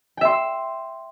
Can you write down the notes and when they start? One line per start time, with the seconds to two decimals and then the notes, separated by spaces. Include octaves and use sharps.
0.17 G5
0.21 E5
0.25 C6
0.29 E6